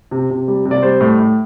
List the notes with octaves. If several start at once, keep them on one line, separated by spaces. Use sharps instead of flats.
C3
C3
G3
C3
D5
G3 C5
A2
A2